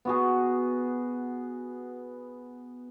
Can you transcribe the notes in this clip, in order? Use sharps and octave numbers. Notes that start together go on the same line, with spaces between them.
B3 F#4 G#4